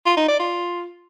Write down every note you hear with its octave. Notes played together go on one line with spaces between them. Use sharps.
F4
D#4
D5
F4